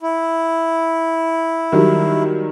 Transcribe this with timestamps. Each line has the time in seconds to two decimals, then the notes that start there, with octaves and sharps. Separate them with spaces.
0.01 E4
1.72 D#3 F#3 G3